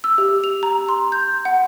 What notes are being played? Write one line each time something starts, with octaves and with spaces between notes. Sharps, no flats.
E6
G4
F7
A#5
C6
G6
F#5